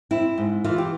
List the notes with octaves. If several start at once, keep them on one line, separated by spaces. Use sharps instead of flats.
C4 E4
G#2
E3 F4
G4